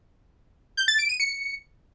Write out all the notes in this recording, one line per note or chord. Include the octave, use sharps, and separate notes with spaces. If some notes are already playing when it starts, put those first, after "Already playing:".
G6
A6
D7
D#7
C#7